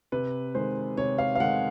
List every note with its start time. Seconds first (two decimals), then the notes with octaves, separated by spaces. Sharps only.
0.12 C3 B4
0.55 D#3 G#3 C5
0.97 C3 C#5
1.18 F5
1.35 F5
1.40 D#3 G#3 F#5